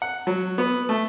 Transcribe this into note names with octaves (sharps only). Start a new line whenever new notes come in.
F#5
F#3
B3
A3